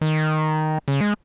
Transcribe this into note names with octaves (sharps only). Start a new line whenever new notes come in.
D#3
C#3
G#3